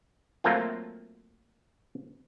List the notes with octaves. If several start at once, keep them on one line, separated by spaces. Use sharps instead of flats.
F#3 A3 A#3 C4 F4